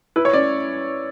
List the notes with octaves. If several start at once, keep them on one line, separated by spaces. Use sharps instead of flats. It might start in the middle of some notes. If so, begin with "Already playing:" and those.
E4 B4
C#5
C#4 D5